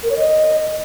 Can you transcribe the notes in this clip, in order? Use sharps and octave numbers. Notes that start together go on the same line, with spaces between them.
A#4
C#5
D#5